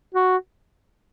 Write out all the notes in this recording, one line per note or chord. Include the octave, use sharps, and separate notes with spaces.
F#4